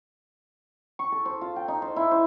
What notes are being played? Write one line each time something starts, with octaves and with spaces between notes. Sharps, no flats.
C#6
A4
C5
F4
G5
D#4
C5
E4
C5